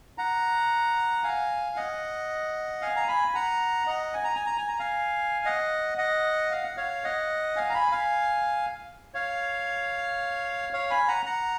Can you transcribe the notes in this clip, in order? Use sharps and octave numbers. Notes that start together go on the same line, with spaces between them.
F#5 A#5
F5 G#5
D#5 F#5
F5 G#5
A#5
G#5 B5
G#5
F#5 A#5
D#5 F#5
G#5
A#5
G#5
A#5
G#5
A#5
F5 G#5
D#5 F#5
D#5 F#5
F5
F#5
C#5 F5
D#5 F#5
F5 G#5
A#5
G#5 B5
F5 G#5
C#5 F5
C#5 F5
G#5 B5
F#5 A#5
F#5 A#5